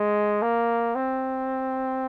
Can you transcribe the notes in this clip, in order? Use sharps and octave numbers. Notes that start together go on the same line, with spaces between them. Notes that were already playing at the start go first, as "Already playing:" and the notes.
Already playing: G#3
A#3
C4